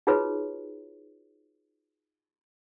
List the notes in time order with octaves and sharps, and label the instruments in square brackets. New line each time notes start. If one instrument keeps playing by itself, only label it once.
[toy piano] D#4 F4 F#4 G#4 B4 C#5